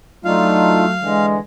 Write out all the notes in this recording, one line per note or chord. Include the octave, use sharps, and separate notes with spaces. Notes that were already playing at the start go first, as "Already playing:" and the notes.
F#3 A3 D4 D#4 F4 F5
D3 E3 G#3